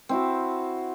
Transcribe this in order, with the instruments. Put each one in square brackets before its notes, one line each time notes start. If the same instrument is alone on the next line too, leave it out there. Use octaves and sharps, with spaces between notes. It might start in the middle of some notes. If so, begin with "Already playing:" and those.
[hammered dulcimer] C4 E4 F#4